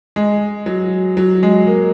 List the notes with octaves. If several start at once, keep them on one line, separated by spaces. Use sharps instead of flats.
G#3
F#3
F#3
G#3
A#3